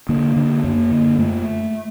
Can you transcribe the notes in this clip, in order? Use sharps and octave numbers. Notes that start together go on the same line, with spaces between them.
D3 A#3
D3
F#2 A#3
D3
F#2 A3